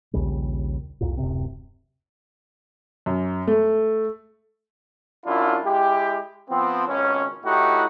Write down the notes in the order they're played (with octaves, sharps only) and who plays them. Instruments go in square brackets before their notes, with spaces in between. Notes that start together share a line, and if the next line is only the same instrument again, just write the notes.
[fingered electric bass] A#1 D#2 C#3 G3
C2 F2 A#2
D1 F#2 C3 C4
[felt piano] F#2
A3
[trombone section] F#2 D4 E4 F4
G#3 E4 G4
F3 B3 C4
G#1 C#2 C#4
A2 D#4 E4 F#4 G4